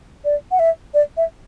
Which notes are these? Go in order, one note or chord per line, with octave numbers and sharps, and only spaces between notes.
D5
F#5
E5
D5
E5